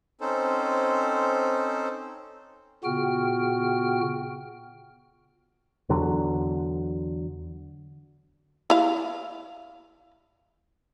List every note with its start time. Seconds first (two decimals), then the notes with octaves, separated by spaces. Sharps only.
0.21 C4 C#4 D#4 A4 C5
2.84 A#2 C#3 B3 F#4 G5 F6
5.89 E2 D3 F#3
8.70 E4 F5